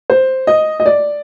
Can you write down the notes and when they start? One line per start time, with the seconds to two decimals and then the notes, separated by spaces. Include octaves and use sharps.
0.10 C5
0.47 D#5
0.80 D#5
0.86 D5